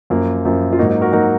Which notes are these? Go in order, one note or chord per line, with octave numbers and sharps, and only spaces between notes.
F#2 F3 A#3
F#2 F3 A#3
F4
G#2 F#3 A#3 D#4 F#4
D#4
F#4 A#4
F#3 A#3 D#4 F#4